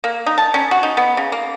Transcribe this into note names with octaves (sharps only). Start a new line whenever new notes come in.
A#3
D#4
A5
C#4
F#4
D#4
B3
C#3
A#3